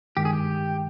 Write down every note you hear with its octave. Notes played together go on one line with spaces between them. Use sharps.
G2 D#3 G#3 G4
G#4
G4